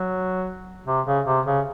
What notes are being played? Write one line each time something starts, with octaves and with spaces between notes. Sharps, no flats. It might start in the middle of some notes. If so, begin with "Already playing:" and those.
Already playing: F#3
C3
C#3
C3
C#3